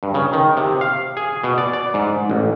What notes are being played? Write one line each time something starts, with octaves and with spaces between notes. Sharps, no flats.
G2
C#3
D#3
C3
F5
G#4
B2
D5
D5
G#2
A1